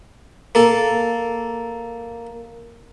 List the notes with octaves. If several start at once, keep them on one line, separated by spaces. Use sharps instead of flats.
A#3 A4